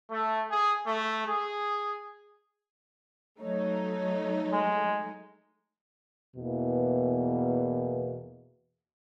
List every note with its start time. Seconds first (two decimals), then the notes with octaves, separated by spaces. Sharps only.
0.11 A3
0.50 G#4
0.86 A3
1.27 G#4
3.40 F#3 A3 D#4 C#5
4.52 G#3
6.35 E2 B2 E3 A#3